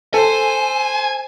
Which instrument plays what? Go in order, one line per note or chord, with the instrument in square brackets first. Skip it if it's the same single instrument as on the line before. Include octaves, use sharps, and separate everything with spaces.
[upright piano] A4 [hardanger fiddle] C5 [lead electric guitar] G#5